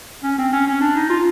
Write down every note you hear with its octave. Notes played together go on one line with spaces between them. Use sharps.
C#4
C4
C#4
C#4
D4
D#4
F4